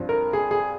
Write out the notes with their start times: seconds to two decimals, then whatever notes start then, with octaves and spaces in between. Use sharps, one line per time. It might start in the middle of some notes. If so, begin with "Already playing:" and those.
Already playing: G2 F3 C4
0.09 A#4
0.33 G#4
0.51 G#4